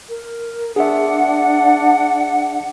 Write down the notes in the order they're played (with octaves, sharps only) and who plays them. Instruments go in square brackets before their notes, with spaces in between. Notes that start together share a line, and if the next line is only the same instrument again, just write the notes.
[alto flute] A#4
[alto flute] D4 [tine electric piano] G#4 E5 [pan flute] F#5